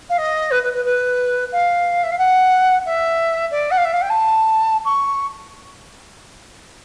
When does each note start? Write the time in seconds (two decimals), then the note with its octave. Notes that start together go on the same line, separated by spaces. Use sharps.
0.09 F5
0.18 D#5
0.51 B4
0.62 B4
0.73 B4
0.85 B4
1.52 F5
2.03 E5
2.11 F5
2.18 F#5
2.85 E5
3.51 D5
3.70 F#5
3.77 F5
3.84 E5
3.93 F5
4.01 G5
4.09 A5
4.85 C#6